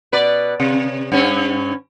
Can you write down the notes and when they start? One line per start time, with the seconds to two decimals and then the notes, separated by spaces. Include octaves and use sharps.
0.12 B2 B4 D5
0.60 C3
1.12 G2 C#4